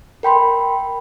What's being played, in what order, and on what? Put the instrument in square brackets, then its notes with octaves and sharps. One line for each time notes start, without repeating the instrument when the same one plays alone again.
[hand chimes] A#4 G5 B5 C6